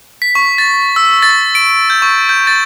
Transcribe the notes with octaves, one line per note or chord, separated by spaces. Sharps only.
B6
C#6
A6
E6
A6
D7
G6
C#6
G6
A6